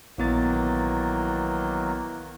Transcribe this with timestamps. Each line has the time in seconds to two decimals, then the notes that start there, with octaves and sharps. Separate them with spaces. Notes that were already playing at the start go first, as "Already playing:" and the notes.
0.18 A#1 D#3 E3 F#3 A#3 B3 A6